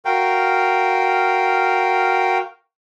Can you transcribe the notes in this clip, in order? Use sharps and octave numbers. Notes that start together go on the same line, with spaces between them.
F#4 A#4 F5 G5